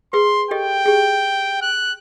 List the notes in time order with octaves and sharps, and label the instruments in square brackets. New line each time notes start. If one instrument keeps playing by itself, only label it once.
[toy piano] G#4 B4 [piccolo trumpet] C6
[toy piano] G4 A4 D#5 [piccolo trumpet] G5
[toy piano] G4 G#4
[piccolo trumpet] F#6